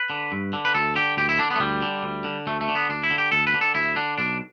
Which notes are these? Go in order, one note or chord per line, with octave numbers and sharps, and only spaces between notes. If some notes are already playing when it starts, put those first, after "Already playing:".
Already playing: B4
D3
G2
D3
B4
D2 A4
D3 G4
D2 G4
E4
D3 D4
B3
A3
D2 G3
D3
D2
D3
D2 A3
A3
D3
B3
D2 D4
E4
D3
G4
D2 A4
B4
D3
A4
D2 E4
D3 D4
B1 D4